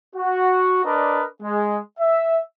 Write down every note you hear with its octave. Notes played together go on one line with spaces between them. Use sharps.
F#4
D4 A#4 B4 D5 D#5
G#3
E5